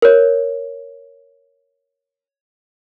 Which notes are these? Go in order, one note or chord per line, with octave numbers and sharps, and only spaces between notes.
A#4 C#5